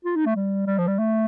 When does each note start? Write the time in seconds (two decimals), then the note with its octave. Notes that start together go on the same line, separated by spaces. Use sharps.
0.05 F4
0.16 D#4
0.26 A3
0.36 G3
0.67 G3
0.78 F3
0.87 G3
0.99 A3